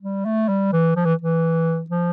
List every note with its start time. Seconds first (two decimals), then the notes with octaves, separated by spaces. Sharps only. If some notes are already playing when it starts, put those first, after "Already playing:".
0.02 G3
0.25 A3
0.49 G3
0.73 E3
0.96 F3
1.05 E3
1.22 E3
1.90 F3